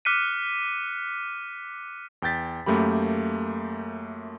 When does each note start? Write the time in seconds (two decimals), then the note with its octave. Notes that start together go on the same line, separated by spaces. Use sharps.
0.05 D6 F6 F#6 B6 C#7 D#7
2.22 E2 G5 G6 A6 B6
2.66 F#2 A3 A#3 G4 B5